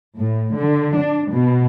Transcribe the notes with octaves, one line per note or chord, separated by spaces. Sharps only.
A2
D3
D4
B2